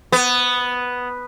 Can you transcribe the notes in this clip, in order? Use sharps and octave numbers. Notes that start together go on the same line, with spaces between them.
B3